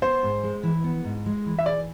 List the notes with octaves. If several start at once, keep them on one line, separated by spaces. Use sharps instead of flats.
B3 C5
G#2
G#3
E3
B3
G#2
G#3
E3
E5
G#4 D5